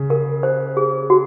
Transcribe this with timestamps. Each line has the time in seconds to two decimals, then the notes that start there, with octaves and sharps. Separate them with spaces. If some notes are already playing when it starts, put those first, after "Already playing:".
Already playing: C#3
0.10 A#4
0.43 C5
0.77 G#4
1.10 F#4